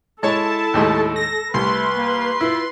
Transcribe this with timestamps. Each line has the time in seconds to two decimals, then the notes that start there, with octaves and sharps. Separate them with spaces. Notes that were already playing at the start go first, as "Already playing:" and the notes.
0.23 G#3 E4 A4 C#5 A5
0.74 D#2 A2 G#3
1.16 A#6
1.54 C2 A3 B4 C6
1.95 A#3
2.41 E4 F4